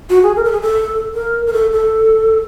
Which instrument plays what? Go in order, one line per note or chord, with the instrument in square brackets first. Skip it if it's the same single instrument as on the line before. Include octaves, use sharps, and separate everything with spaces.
[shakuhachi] F#4
G#4
A#4
A4
G#4
A4
A#4
A#4
A4
A4